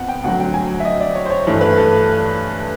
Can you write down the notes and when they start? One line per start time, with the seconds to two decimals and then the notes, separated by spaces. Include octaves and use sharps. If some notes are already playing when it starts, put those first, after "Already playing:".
Already playing: F2 B3 F#5
0.08 G5
0.24 D2 D3 F#3 F#5
0.39 G5
0.54 G#5
0.80 E5
0.85 D#5
1.00 D5
1.15 C#5
1.26 C5
1.30 C#5
1.47 G2 E3 A3 A4
1.61 B4
1.77 A4